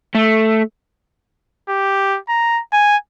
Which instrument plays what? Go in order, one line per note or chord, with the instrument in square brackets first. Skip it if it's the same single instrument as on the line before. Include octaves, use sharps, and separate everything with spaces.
[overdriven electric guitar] A3
[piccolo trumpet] G4
A#5
G#5